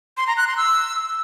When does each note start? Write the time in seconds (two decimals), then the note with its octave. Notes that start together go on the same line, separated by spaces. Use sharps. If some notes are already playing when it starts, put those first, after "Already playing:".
0.17 C6
0.27 A#5
0.37 F#6
0.47 C6
0.57 E6